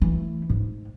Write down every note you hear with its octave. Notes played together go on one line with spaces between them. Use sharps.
E3 A3
G#2